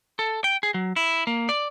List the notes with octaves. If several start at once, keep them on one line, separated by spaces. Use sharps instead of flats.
A4
G5
G#4
F#3
E4
A#3
D5